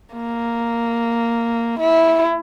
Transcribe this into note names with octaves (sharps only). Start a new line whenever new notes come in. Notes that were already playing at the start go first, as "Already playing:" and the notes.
A#3
E4